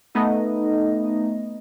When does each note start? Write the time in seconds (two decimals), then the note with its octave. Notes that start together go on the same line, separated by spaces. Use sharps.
0.15 A3 B3 D#4 D#5